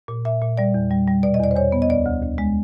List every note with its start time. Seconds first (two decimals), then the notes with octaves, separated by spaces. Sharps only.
0.08 A#2
0.25 A#2 E5
0.42 A#2
0.57 G3 D5
0.74 E2
0.91 G3
1.08 G3
1.23 B2 D5
1.34 D#5
1.40 E2 D5
1.51 C5
1.56 E2 C#5
1.72 B3
1.82 D#5
1.89 D2 D5
2.06 D2
2.23 D2
2.38 G#3